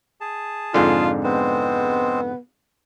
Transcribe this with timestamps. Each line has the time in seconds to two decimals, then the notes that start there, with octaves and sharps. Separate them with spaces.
0.21 G#4 A5
0.74 F2 G#2 D3 F4
1.24 G#3 B3 C4 C5